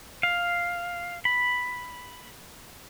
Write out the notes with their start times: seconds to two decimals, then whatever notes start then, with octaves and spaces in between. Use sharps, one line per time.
0.23 F5
1.25 B5